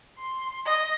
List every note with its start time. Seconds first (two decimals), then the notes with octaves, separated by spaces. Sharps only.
0.18 C6
0.65 D#5